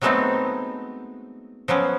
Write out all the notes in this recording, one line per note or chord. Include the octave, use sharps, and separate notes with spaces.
F#3 G#3 A3 B3 C4 D#4
F3 F#3 B3 C#4